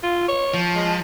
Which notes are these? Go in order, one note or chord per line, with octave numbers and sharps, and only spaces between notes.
F4
C#5
F3
G#3